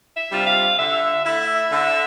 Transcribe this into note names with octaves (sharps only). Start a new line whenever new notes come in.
E5
C3 G3 D4 F4
F5
D3 E5
A3 E4 E5
D3